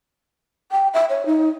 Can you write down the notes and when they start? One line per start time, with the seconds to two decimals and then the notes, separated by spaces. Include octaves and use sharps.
0.72 G5
0.94 E5
1.09 C#5
1.26 D#4